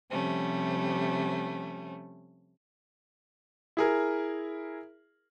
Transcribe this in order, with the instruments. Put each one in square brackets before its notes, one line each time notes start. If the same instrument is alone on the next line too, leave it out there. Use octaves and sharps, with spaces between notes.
[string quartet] C3 F3 G3 A3 C#4
[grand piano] E4 G#4 A#4